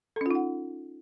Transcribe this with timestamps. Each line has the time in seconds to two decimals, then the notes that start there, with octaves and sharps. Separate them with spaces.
0.16 A4
0.21 C#4
0.26 F4
0.31 D#4
0.35 F#5